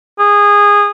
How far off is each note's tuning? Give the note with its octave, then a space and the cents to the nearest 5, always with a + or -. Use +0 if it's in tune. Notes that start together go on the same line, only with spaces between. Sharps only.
G#4 -20